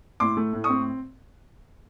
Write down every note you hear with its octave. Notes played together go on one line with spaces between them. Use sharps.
A2 C6 D6
A3
A2
C#6 D#6
C4